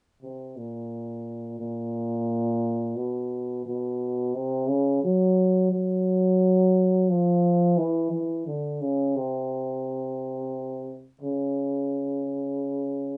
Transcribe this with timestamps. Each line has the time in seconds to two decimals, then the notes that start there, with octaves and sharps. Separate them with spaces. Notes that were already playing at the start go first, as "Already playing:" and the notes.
0.22 C3
0.56 A#2
1.59 A#2
2.96 B2
3.66 B2
4.34 C3
4.69 C#3
5.03 F#3
5.72 F#3
7.09 F3
7.77 E3
8.11 E3
8.46 D3
8.81 C#3
9.16 C3
11.21 C#3